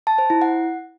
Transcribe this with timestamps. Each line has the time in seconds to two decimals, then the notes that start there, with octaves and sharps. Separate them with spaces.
0.07 A5
0.18 C5
0.30 E4
0.42 F#5